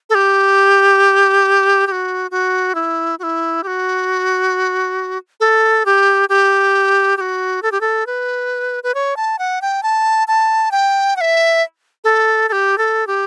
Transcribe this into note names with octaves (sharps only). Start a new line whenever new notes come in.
A4
G4
G4
F#4
F#4
E4
F#4
E4
G4
F#4
A4
G4
G4
G4
F#4
A4
G4
A4
B4
B4
C#5
A5
F#5
G5
A5
A5
G5
F#5
E5
A4
A4
G4
A4
G4